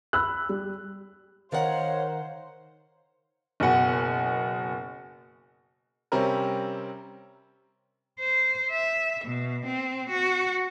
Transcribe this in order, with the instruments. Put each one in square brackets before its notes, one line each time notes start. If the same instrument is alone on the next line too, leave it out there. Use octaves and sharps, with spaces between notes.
[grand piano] B5 E6 F#6
G3
[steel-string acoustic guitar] D#3 A#4 F#5 [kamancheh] C5 [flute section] C#5 [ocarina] F5
[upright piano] F#1 B2 F#5 G#5
[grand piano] C3 G3 C4 C#4 A#4
[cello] C5
E5
B2
C4
F#4